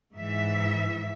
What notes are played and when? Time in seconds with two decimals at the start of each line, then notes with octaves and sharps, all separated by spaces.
0.13 G#2 E3 E5